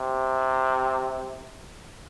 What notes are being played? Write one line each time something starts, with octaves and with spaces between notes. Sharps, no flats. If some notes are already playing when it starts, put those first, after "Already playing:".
Already playing: C3